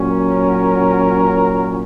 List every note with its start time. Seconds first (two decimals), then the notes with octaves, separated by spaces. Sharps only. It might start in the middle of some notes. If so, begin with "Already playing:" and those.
Already playing: A#2 F#3 C#4
0.09 A#4